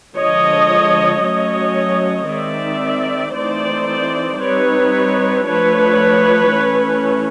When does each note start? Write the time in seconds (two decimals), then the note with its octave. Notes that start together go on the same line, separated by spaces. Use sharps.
0.17 D3 F3 G#3 C#5 D#5
1.23 F#3 A3 C#4 C#5 D#5
2.29 D#3 G#3 C4 D#4 D5 E5
3.35 E3 A3 C4 D#4 C5 D5
4.41 G3 C4 D#4 B4 C#5
5.48 F3 A3 D4 B4 C#5
6.54 E3 A3 C#4